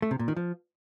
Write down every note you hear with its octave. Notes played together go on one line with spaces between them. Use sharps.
A3
C3
A#2
D#3
F3